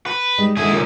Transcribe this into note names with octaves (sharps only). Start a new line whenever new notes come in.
B4
G3 G#3 D#4
D3 D#3 G#3 E4 G#4
C#2 A#2